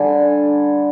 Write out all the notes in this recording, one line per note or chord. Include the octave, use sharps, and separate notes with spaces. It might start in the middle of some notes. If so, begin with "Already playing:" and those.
Already playing: D3 G3 G#5